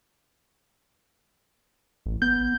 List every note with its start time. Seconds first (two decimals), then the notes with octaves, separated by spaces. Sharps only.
2.06 A1
2.22 B3 G6